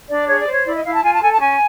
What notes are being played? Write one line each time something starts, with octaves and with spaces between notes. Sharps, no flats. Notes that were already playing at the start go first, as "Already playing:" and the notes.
D4 D5
G#4 C#5
D5
C5
C#5
E4 D5
D#5
E4 F5
A5
F4 G#5
A5
A4 G#5
A5
C#4 G#5